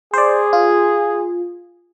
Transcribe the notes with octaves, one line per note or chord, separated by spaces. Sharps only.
G#4 C5 D5
F4